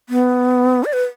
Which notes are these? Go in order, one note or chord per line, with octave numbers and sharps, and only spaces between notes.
B3
D5
B4